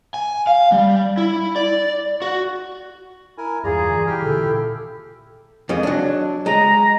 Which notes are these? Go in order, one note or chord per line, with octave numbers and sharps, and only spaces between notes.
G#5
F5
G3
E4
D5
F#4
E4 A#4 G#5
E2 G2 F4 G#4 D5 A#5
E3
E4 G4 G5 F6
A#2 D3 A4
F2 D#3 G#3
F#3 D4
G#3 A#5